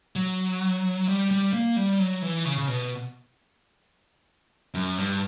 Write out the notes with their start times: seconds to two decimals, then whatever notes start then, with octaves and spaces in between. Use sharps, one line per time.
0.16 F#3
1.08 G3
1.31 G3
1.53 A#3
1.77 G3
1.99 F#3
2.22 E3
2.45 C#3
2.58 C#3
2.68 B2
4.74 F#2
4.98 G2